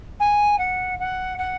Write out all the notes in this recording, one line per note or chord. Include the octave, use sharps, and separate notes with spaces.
G#5
F#5
F#5
F#5